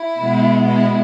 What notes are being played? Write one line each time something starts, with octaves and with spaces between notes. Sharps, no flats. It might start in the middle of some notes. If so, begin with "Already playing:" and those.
Already playing: E4
B2 G#3 B3
E4